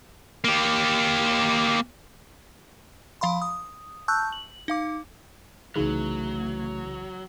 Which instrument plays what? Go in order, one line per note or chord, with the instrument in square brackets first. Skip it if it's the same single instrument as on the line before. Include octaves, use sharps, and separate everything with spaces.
[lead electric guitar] A#3 G4
[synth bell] F3 F5 B5 C6
D#6
A5 C#6 E6 F#6 G6
F#7
D#4 F5 D6
[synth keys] C2 C#3 E3 [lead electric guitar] F#3 [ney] A3 [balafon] D#4 G#4